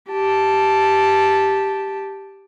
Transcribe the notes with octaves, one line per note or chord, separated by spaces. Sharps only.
G4 A5